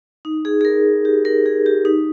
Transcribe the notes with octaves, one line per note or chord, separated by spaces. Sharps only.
D#4
G#4
G#4
A#4
G4
A#4
G#4
G4
D#4